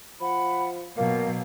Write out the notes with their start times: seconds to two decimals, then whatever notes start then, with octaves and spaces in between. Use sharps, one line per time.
0.21 F3 F#5 B5
0.97 B2 F#3 A#3 F5